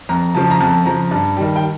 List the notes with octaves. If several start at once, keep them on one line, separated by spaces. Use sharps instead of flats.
F2 A#5
C#3 F3 A5
A#5
F2 A5
C#3 F3 A#5
G2 A5
D#3 G3
G5